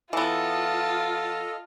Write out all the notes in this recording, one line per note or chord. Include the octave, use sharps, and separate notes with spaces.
E3 B3 F4 A4 D#5 A5